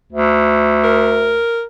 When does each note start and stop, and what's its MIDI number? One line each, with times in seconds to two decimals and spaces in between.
0.12 1.44 38
0.84 1.64 70